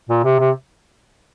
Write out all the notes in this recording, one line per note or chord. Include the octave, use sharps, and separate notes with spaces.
A#2
C3
C3